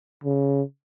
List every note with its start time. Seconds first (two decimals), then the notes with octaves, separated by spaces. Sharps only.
0.24 C#3